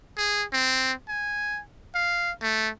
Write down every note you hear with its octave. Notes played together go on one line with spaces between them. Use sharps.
G#4
C4
G#5
F5
A3